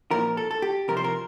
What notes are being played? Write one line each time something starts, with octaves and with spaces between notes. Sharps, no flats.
A#2 F3 A#4
A4
A4
G4
C3 F3 A#4
C5
A#4